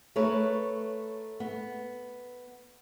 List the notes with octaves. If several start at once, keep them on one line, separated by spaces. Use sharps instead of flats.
A3 A#4 B4 C#5
B3